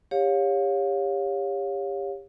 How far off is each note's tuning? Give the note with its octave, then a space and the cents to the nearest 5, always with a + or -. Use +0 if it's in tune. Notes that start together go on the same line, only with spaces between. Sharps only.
G4 +30 C#5 +0 F5 +25